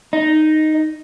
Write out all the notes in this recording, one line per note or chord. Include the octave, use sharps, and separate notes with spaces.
D#4